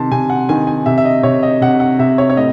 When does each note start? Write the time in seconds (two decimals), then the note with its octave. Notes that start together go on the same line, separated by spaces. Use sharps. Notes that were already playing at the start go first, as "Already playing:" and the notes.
Already playing: C3 D#3 A5 C6
0.12 C3 G#5
0.30 F#5
0.49 D#3 G#5
0.67 G#5
0.86 C3 E5
0.98 E5
1.05 D#5
1.23 C3 C#5
1.43 D#5
1.61 C3 F#5
1.80 F#5
1.99 C3 E5
2.18 C#5
2.30 C#5
2.37 A2 D#5